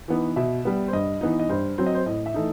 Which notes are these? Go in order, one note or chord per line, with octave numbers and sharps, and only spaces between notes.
E3 B3 D#4
B2 E5
G3 B3
C5
G2 D#5
E3 B3 D#4
D#5
G2 C5
F#3 C4 C5
D#5
C5
A2 D#5
E5
E3 A3 D#4